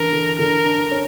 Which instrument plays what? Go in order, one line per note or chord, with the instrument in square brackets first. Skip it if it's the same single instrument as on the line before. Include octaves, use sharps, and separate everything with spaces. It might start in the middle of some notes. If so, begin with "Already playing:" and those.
Already playing: [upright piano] E3 D4 [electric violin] A#4
[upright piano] D3
[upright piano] D3 [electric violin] A#4
[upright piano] D4
C#4